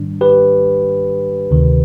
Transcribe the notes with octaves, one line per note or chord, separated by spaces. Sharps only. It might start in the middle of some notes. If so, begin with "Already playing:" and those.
Already playing: G#2 D#3 G3 D4
G4 B4
D2 C3 D#3